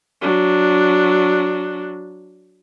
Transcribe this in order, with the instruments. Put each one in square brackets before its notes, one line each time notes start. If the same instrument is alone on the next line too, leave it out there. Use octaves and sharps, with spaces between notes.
[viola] F#3 D4